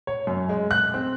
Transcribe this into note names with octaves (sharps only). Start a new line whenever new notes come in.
C#5
F#2
G#3
F#6
C4